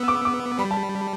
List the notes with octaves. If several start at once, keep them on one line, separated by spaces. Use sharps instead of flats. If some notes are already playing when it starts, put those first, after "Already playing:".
Already playing: B3 E6
D6
D6
G3 B5
A5